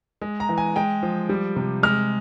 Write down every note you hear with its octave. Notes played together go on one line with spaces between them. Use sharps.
G#3
A#5
E3
G#5
G#3 G5
F3
G3
C3
G#3 F6